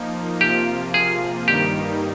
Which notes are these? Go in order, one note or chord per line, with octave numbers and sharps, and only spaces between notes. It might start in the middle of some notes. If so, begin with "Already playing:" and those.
Already playing: F3 A#3 D#4
C3 F3 A#3 F4 G4
G#4
G2 D#3 G3 A#3 D#4 G4